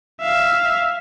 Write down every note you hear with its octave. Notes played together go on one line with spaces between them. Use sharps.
E5 F5